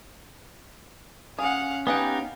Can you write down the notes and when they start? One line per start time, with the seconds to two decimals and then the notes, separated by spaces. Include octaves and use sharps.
1.39 C#4 G#4 F5 F#5
1.87 B3 D#4 G4 G#4 B4 F5 F#5